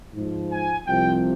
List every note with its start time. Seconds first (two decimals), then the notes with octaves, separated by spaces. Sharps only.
0.14 G#2 F3
0.51 G#5
0.87 C2 C3 F3 G5